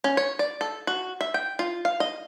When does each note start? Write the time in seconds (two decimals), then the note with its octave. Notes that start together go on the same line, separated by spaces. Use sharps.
0.04 C#4
0.17 C#5
0.39 D5
0.61 A4
0.87 F#4
1.21 E5
1.34 G5
1.59 F4
1.85 F5
2.00 D#5